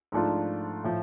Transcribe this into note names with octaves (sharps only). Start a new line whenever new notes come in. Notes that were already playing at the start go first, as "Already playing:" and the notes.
G#2 F3 A3 D4 F4
A2 F3